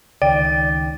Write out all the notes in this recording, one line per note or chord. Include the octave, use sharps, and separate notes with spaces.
C#2 D#3 D5 G5